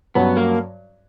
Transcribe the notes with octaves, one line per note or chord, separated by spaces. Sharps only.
G2 F#3 B3 C#4 F#4 C#5
A#3